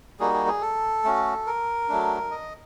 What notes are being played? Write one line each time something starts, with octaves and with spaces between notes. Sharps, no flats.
G3 A#3 D#4 F#4 G#4
G#4
G#4
A4
A3 C#4 F#4
A#4
F#3 A3 D4
D#5